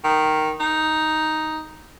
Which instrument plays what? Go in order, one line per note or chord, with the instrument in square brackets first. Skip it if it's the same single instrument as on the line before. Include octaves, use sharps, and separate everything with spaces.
[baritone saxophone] D#3
D#4